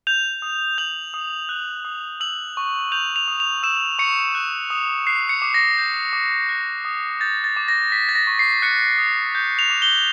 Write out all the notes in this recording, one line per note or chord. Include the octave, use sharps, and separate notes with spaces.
G6 F7
D#6
G6 F#7
D#6
F#6
D#6
E6 F#7
C#6
G6 F7
F7
D#6
F7
E6 E7
C#6 C#7
F#6
D#6
F#6 C7
C#7
D6
A#6
G6
D6
F#6
D#6
G6 A6
A6
D6
A#6
F#6 B6
A6
A#6
C#6
C7
F#6 C#7
D#6
G6
F7
D6
G7